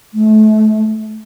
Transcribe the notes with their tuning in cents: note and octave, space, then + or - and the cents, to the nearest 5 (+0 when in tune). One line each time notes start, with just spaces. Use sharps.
A3 -30